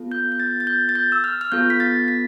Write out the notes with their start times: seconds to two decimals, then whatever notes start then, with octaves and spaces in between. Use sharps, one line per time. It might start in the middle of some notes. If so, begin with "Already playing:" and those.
Already playing: B3 F4 A4
0.12 G6
0.32 G6
0.40 A6
0.60 A6
0.67 G6
0.89 A6
0.95 G6
1.12 E6
1.24 F6
1.41 F6
1.52 B3 F4 A4 G6
1.70 B6
1.80 A6
2.08 B6